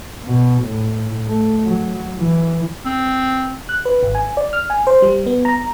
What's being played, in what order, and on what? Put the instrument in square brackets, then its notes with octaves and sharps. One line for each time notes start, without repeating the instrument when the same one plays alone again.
[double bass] B2
A2
A3
F#3
E3
[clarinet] C4
[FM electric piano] F#6
B4
G#1
G#5
D5
F6
G#5
C5
G3
B3
A#5